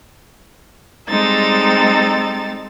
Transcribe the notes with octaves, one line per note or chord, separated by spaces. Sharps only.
G3 G#3 C4 D#4 A4 A6